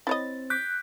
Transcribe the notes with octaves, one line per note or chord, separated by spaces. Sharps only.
C4 E4 C#5 D#5 A6
D6 F#6 G6 B6